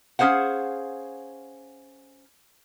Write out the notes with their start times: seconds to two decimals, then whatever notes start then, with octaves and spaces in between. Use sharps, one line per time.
0.19 C#4 G#4 C5 F5 F#5